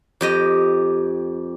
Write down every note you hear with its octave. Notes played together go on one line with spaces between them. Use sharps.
F2 G4 D#5